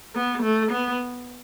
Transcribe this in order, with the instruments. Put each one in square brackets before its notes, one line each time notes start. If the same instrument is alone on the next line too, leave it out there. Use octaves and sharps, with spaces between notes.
[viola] B3
A3
B3